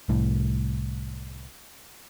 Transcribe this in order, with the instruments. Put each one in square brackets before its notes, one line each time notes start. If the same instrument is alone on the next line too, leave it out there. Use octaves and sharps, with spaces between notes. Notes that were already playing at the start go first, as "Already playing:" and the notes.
[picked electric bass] C2 A2